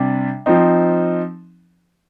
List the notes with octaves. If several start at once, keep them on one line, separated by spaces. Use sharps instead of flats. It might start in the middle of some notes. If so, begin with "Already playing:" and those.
Already playing: C3 G3 D4
F3 C4 D#4